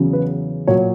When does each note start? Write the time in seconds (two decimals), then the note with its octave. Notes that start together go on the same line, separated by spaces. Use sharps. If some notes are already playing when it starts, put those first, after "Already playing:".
Already playing: E2 C#3 F#3
0.13 B4
0.67 A#2 F#3 C#5